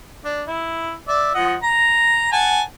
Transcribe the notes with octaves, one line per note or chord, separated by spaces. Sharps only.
D4
E4
D5 E5
F3 D#5 F#5
A#5
F#5 G#5 A5